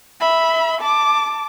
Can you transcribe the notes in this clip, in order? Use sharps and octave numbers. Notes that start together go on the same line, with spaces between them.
E5 B5
A5 D6